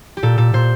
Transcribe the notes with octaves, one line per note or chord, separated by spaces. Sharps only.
G4
A#2 A4
A#2 A4
A#2 C5